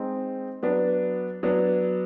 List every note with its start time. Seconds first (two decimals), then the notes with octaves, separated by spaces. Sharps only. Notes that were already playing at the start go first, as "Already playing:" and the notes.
Already playing: G#3 C4 D#4
0.63 F#3 B3 D4
1.43 F#3 B3 D4